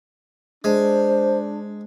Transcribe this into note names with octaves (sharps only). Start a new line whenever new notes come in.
G#3 D4 C5